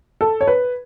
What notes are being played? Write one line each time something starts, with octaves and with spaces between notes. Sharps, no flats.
A4
C#5
B4